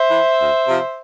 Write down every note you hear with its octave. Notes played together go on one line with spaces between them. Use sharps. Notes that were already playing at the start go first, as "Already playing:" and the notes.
Already playing: C5 E5
E3
D2
C3 F3